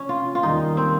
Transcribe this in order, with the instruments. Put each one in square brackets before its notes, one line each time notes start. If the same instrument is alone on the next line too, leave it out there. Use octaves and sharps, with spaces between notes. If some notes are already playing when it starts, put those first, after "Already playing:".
Already playing: [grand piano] C3 F3 [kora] C#4
[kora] F4
F4
[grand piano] D#2 D#3 G3 A#3 [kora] D#4
[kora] C4